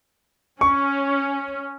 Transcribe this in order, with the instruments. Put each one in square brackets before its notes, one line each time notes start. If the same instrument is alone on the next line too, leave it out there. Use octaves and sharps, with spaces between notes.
[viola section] C#4 [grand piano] C#6